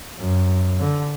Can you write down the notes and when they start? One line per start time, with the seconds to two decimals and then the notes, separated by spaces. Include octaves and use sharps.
0.19 F#2
0.80 D3